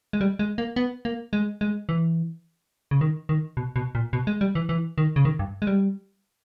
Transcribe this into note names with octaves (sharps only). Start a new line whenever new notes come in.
G#3
G3
G#3
A#3
B3
A#3
G#3
G#3
E3
C#3
D#3
D#3
B2
B2
A#2
B2
G#3
G3
E3
E3
D#3
C#3
D#3
G2
G#3
G3